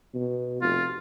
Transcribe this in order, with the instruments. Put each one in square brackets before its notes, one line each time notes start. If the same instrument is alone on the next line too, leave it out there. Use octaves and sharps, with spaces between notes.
[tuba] B2
[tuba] F1 [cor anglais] F4